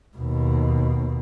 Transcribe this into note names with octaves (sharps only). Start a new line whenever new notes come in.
D#2 B2